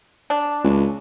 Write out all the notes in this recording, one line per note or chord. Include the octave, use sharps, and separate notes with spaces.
D4
C#2